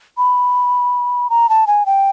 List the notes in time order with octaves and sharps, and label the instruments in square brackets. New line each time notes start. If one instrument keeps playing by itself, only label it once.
[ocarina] B5
A#5
A5
G#5
G5